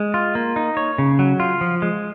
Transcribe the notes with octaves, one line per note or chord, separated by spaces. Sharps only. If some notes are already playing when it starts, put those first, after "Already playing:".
Already playing: G#3
F4
A#3
D#4
C#5
C#3
F#3
F4
F3
G#3